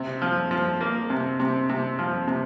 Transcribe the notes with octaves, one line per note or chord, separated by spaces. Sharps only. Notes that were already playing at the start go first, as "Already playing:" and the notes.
Already playing: C3
F3
F3
A#3
C3
C3
C3
F3
C3